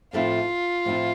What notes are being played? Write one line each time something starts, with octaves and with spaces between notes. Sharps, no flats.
A2 F3 A3 C4 E4 F4
A2 F3 A3 C4 E4